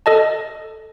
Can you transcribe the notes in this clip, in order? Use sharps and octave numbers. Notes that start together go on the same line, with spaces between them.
A4 D#5 A5